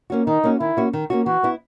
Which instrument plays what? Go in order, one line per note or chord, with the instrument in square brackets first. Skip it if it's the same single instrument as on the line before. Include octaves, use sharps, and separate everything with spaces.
[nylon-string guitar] A#3 C#4 F#4
[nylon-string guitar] D#3 [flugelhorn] D#4
[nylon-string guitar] A#3 C#4 F#4
[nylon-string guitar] D#3 [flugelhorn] E4
[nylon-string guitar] A#3 C#4 F#4
D#3
A#3 C#4 F#4
[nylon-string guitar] E3 [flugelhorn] F#4
[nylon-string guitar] B3 E4